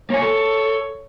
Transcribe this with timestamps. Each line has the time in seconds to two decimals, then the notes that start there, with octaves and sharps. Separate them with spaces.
0.10 A#3 C#5 G#5
0.22 A4